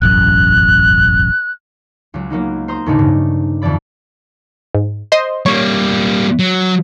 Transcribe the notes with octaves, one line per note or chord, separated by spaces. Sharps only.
E1 A1 F#2 F#6
C#2 F#3
F#3 A#3 B3 D#4
C5 A#5 C6 D#6
D#2 A2 C#3 A3 D4 D#4
G2 C#3
F2 D3 E3 D5 B5
G#2
C5 D#5 C6
G3 A#3 C#5
F#3